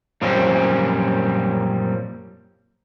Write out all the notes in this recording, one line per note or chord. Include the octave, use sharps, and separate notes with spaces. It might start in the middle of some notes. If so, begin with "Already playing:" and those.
F#2 A#2 F3 G3 C4 C#4